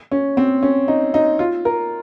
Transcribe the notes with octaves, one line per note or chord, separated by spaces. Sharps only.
C#4
C4
C#4
D#4
D#4
F4
A#4